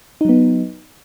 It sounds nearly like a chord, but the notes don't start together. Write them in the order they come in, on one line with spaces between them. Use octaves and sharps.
D#4 F#3 B3